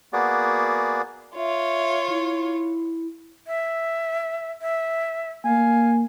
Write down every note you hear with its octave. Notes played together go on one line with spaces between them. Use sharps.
A#3 B3 F#4 G#4 D5
F4 C#5 E5
E4
E5
E5
A#3 F5 G#5